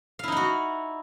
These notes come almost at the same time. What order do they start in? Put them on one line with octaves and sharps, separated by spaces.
F5 E4 D#4 F#5 F#4